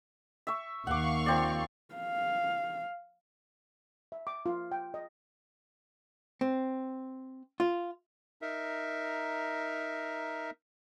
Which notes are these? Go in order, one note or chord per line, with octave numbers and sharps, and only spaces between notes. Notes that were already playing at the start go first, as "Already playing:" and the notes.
E5 C#6
D#2 F5 F#5 C#6 D6
F3 C4 D5
F5
E5
D6
F4
G5
D#5
C4
F4
D#4 A#4 E5